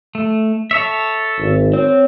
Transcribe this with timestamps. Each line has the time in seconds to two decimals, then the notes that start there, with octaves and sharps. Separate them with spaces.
0.15 A3
0.71 A4 C#5 E5
1.39 G#1
1.73 C4 C#5